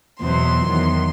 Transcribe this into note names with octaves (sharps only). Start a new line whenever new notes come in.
E2 B2 F#3 C4 C6
E2 D#3 F#3